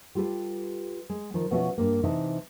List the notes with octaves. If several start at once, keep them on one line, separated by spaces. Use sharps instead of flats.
G3 F4 G4 A4 B4
G#3
D#3 F3
B2 F3 B3 C#4 F#4 E5
G2 A#3
C3 E3 D#4 E5 A5